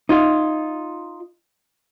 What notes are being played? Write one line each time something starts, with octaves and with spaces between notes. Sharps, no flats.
D#4 F4